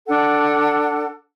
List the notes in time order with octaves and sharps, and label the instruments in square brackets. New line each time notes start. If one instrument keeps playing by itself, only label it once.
[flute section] D4 A4 F#5